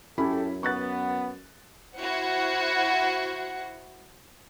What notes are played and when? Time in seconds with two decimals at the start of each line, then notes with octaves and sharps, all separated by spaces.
0.18 F#2 C#4 E4 G4 A4 B5
0.63 B3 C#6 F#6 A6
1.97 E4 F#4 C5 F#5